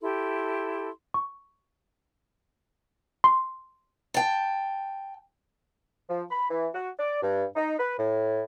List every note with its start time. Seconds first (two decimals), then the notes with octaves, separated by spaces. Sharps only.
0.01 E4 G4 A4 C6
1.14 C#6
3.24 C6
4.14 G5 A5
6.10 F3
6.31 B5
6.50 E3
6.75 F#4
6.99 D5
7.23 G2
7.56 D#4
7.79 B4
7.99 A2